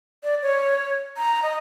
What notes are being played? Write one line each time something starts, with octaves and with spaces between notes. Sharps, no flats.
D5
C#5
A#5
D#5